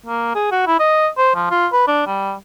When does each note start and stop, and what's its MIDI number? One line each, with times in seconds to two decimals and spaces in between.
0.06 0.31 58
0.35 0.47 68
0.52 0.65 66
0.67 0.78 64
0.80 1.08 75
1.17 1.33 72
1.35 1.48 53
1.51 1.67 65
1.72 1.87 71
1.88 2.02 62
2.07 2.34 55